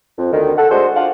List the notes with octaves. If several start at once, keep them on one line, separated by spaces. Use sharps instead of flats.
F2
D2 D3 D#3
A4 F#5
G#3 A3 D4 F#4 C5
D4 F4 D5 F5 F#5